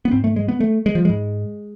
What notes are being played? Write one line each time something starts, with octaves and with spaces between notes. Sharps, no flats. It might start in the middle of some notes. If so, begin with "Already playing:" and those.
B3
G#2 C4
A3
G#3
B3
A3
G#3
F3
G#2 G#3